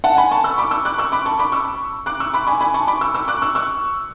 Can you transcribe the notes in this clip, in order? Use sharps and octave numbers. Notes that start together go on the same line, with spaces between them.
F#5 A5
G#5 B5
A5 C#6
C#6 E6
B5 D6
C#6 E6
D6 F#6
C#6 E6
B5 D6
A5 C#6
B5 D6
C#6 E6
D6 F#6
C#6 E6
B5 D6
G#5 B5
G#5 B5
A5 C#6
B5 D6
C#6 E6
C#6 E6
D6 F#6
C#6 E6
C#6 E6